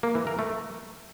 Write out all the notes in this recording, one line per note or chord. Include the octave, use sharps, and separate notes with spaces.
A#3
E3
A#4
A3